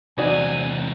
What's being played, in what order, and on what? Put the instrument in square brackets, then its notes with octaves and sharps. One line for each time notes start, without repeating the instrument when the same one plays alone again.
[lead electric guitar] E2 C3 [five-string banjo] D#4 F#4 D5 [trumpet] G#5